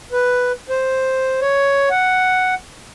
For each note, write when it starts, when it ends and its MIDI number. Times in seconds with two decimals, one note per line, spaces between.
0.12 0.52 71
0.70 1.40 72
1.41 1.89 73
1.91 2.55 78